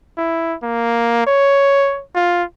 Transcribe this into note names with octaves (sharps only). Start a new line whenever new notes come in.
E4
A#3
C#5
F4